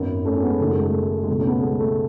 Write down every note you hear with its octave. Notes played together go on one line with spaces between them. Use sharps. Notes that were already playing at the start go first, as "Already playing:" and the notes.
Already playing: G#1 F#2 D#3 B3 D#4
A3 C#4
C#4
G#3 B3
F#1 F#2 D#3 A3
G#3
A3
G#3
C#2 B2 A3
A3 C#4
B3
A3
G#3 B3
A3